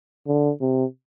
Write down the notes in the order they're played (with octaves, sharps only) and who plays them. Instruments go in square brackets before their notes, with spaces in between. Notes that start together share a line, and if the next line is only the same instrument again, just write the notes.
[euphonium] D3
C3